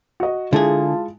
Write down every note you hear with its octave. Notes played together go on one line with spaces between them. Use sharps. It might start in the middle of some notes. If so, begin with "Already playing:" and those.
F#4 D#5
D3 G#3 E4 F4 G#4 A5